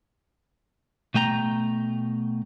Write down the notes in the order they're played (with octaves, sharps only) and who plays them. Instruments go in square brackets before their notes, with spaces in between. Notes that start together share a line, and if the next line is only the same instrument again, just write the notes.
[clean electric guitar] B2 A3 G5 A#5